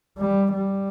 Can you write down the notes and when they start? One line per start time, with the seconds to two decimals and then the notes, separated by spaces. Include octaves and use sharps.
0.18 G3
0.53 G3